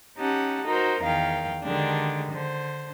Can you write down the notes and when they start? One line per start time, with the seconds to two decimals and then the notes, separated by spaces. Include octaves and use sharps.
0.16 C#4 D#4 G4 F#5 A5
0.63 D#4 F#4 A#4 C5
1.00 E2 D#3 F5 G5
1.63 D3 D#3 G#3 D4 G4
2.30 D3 C5